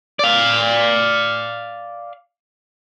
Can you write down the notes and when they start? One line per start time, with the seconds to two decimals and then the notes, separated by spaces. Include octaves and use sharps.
0.19 D5 F5